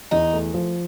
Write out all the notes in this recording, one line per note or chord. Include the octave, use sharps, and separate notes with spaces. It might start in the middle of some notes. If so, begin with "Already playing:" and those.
E2 D#4
A3
F3